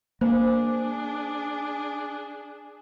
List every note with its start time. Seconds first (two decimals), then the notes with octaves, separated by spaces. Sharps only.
0.21 A#3 D4 G#4 C5